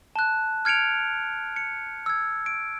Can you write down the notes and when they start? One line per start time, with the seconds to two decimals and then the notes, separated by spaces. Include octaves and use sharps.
0.16 A5 F#6
0.65 F6 G#6 C#7 D7 F7
1.56 C#7
2.06 E6 G#6
2.46 D7